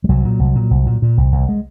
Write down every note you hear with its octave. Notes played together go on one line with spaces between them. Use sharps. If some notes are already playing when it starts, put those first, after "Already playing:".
G3
C2 F#3
A#2
C2
A#2
C2
A#2
A#2
C2
C2
G#3